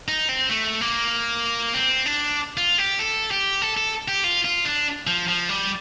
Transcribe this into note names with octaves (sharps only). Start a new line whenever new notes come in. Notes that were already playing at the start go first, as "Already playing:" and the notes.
D#4
C4
A3
A#3
C4
D4
F4
G4
A4
G4
A4
A4
G4
F4
F4
D4
F3
F3
G3